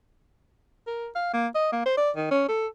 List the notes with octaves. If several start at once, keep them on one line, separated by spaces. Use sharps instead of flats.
A#4
F5
A#3
D#5
A#3
C5
D5
D#3
C#4
A4